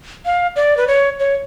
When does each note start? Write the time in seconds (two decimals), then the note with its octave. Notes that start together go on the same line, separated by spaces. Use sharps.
0.25 F5
0.56 D5
0.77 B4
0.88 C#5
1.19 C#5